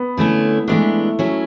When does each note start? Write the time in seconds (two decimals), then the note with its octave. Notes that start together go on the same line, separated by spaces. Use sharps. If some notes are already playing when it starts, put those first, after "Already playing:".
Already playing: B3
0.17 D3 A3 C#4 E4
0.68 E3 G#3 A3 B3 D4
1.19 F#3 C#4 E4